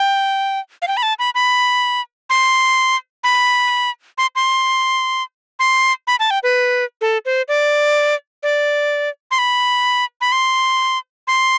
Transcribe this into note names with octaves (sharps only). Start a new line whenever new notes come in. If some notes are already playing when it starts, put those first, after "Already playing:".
Already playing: G5
F5
G5
B5
A5
B5
B5
C6
B5
C6
C6
C6
B5
A5
G5
B4
A4
C5
D5
D5
C6
B5
B5
C6
C6